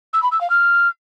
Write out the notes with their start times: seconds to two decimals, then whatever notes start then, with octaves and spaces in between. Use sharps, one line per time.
0.13 E6
0.23 B5
0.32 E6
0.41 F5
0.50 F6